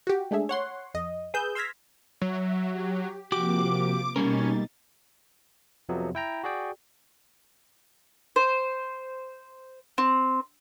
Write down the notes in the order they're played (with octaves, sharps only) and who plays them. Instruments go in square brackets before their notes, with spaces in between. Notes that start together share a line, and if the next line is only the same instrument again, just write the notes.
[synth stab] F#4 G4
G#3 A3 D4 G#4 E5
C#5 F#5 C6
F2 D#5
G#4 B4 D#6 E6 G6
C6 E6 F6 G#6 A#6 B6
[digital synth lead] F#3 [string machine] E5
[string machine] G4
[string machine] C3 F3 A#3 [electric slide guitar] F#4 G4 [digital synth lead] D6
[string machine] B2 D#4 A6 [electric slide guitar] G3 A#3 A#4 [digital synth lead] C#4
[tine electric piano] F2 C3 F3 F#3 B3
E4 G5 A#5
F#4 G#4 D5 G5
[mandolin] C5
C4